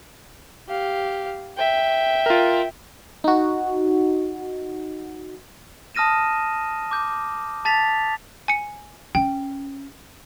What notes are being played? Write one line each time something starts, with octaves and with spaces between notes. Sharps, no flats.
G4 F5
E5 G5
F4 A#4
D#4 F#4
A5 D#6 F6 A#6 D#7 E7
D6 G6
A5 A6 B6 F7
G#5 C#7
C#4 G5